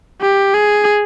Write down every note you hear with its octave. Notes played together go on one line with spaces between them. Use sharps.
G4
G#4